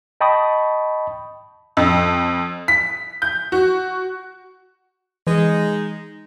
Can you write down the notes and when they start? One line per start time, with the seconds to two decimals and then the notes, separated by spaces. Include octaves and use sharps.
0.21 D#5 G5 A5 B5 C#6 D#6
1.77 F2
2.68 B6
3.22 G6
3.52 F#4
5.27 E3 G#3 D#4